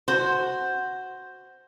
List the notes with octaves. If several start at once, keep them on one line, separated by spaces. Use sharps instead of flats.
F#4 C5